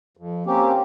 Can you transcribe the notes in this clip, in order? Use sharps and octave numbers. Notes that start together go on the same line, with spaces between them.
F2
A#3 C4 C#4 G4